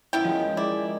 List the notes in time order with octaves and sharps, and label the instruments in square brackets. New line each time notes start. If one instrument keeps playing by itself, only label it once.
[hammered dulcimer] F#2 D#3 [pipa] B3 E4 G5
[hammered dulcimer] D#3 G#3 [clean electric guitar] F3 F4
[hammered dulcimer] G#3 G#4 [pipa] E4 [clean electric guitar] D5